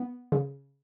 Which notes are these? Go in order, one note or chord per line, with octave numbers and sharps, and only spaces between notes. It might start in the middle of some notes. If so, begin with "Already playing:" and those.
Already playing: B3
C#3